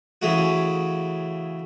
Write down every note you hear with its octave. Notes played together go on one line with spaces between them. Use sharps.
C#3 E3 A3 F#4 G#4